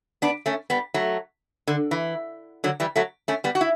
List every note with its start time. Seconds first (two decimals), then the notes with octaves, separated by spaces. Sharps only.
0.22 B3 D4
0.46 A3 C#4
0.70 G3 B3
0.94 F#3 A3
1.67 D3
1.91 E3
2.64 D3 F#3
2.80 E3 G3
2.96 F#3 A3
3.28 A3 C#4
3.44 G3 B3
3.55 F#4
3.61 E4